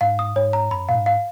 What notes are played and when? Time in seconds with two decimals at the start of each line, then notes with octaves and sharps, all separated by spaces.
0.01 G#2 F5
0.19 D#6
0.36 G#2 C#5
0.53 A#5
0.71 F#2 B5
0.89 A#2 F5
0.95 G#2
1.06 F5